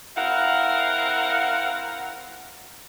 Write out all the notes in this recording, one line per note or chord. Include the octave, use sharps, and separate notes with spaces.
C4 E4 A#4 F5 F#5